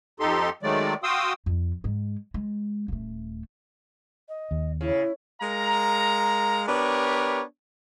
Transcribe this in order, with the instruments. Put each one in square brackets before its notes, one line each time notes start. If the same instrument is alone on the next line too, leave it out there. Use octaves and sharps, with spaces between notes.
[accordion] F2 D#4 G4 A4 C6
D#3 F#3 G#3 A3 D5
F#4 F5 G5 C6 D#6 E6
[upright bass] F2
G#2 G#3
G#3
D#1 A3
[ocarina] D#5
[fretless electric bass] D#2
[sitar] C#3 [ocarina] E4
[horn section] G#3 A#4 F5 A#5
B3 D4 G4 A#4 C#5